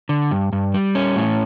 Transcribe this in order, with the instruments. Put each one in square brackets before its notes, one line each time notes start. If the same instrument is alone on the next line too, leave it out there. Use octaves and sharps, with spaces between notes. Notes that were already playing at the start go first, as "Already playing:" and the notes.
[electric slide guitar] D3
G2
G2
G3
C#4
A2